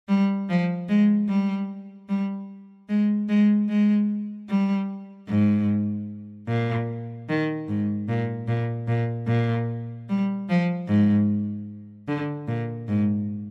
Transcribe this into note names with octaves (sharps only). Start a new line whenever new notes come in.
G3
F3
G#3
G3
G3
G#3
G#3
G#3
G3
G#2
A#2
D#3
G#2
A#2
A#2
A#2
A#2
G3
F3
G#2
D3
A#2
G#2